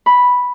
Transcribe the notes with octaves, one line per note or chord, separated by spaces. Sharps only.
B5